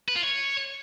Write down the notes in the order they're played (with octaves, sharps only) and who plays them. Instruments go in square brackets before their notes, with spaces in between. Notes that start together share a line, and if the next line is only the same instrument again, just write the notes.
[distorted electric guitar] B4
F4
C#5